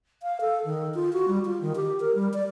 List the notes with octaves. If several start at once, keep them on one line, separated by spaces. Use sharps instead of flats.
F5
A4
D#3
F4
F#4
G3
F4
D#3
G4
A#4
G3
D5